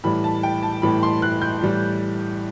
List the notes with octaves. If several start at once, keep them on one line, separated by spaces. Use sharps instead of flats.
A2 E3 G3 B5
A5
G5
A5
A2 E3 G3 B5
C6
F#6
G6
A2 E3 G3